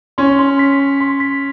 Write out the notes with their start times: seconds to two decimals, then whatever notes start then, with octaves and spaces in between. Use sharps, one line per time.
0.18 C#4 C6
0.39 C6
0.59 B6
0.79 C6
1.01 C6
1.20 B6